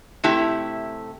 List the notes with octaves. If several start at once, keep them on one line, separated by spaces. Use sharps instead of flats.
C3 A3 E4 G4